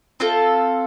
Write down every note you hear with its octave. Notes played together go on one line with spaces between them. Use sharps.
C4 F4 A4